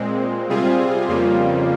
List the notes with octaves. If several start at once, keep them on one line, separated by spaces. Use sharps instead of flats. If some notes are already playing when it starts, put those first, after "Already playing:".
Already playing: A#2 G#3 C4
C3 G3 C4 F4 G#4
F2 C#3 G3 A#3 F4